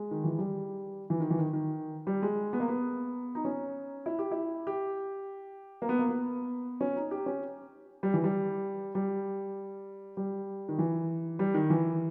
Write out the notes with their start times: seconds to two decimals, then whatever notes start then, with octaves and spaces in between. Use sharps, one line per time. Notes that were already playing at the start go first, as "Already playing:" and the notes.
Already playing: G#3
0.11 D#3
0.24 E3
0.39 G3
1.10 E3
1.20 D#3
1.30 E3
1.38 D#3
1.53 D#3
2.07 G3
2.22 G#3
2.53 B3
2.60 A#3
2.68 B3
3.35 D#4
3.45 C#4
4.06 E4
4.19 G4
4.31 E4
4.67 G4
5.82 A#3
5.89 B3
5.99 A#3
6.09 B3
6.81 C#4
6.96 D#4
7.11 G4
7.26 C#4
8.03 G3
8.14 E3
8.24 G3
8.95 G3
10.17 G3
10.69 D#3
10.79 E3
11.39 G3
11.54 D#3
11.70 E3